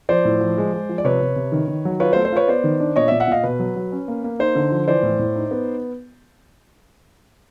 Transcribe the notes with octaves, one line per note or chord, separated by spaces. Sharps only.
F3 C5 D5
A2
F3
G#3
G#3
F3
D5
C3 B4 C#5
C3
C3
D#3
D#3
F#3
F4 B4 C#5
C5
A3
C5
F4 B4 C#5
B3 C5 D5
D#3
D4
A#2 C#5 D#5
A#2 D5 E5
E5 F#5
A#2 D#5 F5
B2 B4
F#3
F#3
C#4
A#3
A#3
D#4 C5
D3
F3
E3 C5 D5
A2
A2
D#4
B3